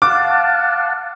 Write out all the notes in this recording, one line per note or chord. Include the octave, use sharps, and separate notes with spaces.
F5 F#5 A5 D6